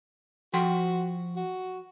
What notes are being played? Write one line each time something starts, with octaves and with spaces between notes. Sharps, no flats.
F3 F#4 G5 C6
F#4